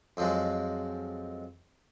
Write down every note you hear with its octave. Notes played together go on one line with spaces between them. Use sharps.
F2 F3 F#3 G#3